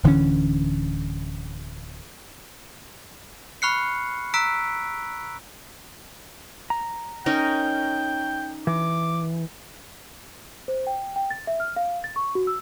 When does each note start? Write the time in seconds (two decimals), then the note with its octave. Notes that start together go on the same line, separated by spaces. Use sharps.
0.03 D1 D3 E3 C#4
3.62 B5 C#6 F6 F#6 C7 C#7
4.34 A#5 E6 F#6 B6 D7
6.70 A#5
7.26 C#4 D#4 A#4 G5
8.67 E3 D6
10.68 C5
10.87 G5
11.16 G5
11.31 A6
11.47 E5
11.60 F6
11.76 F5
12.04 A6
12.16 C#6
12.35 F#4
12.47 E6